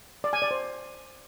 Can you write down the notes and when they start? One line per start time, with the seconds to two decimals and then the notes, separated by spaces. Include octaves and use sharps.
0.24 D5
0.33 G#5
0.42 D5
0.51 C5